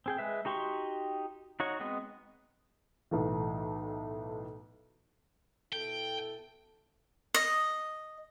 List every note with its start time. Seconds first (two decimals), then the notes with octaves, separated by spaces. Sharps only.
0.06 C4 G#4 G5
0.18 G#3 B4 E5
0.45 D#4 F#4 G4 C6 C#6
1.60 D#4 F#4 C#5
1.80 G#3 B3 C4 D#5
3.11 B1 A2 E3
5.73 B2 E4 A4 G5
7.34 D#5